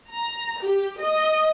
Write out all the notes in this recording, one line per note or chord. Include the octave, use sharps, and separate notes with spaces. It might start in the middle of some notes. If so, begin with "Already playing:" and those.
A#5
G4
D#5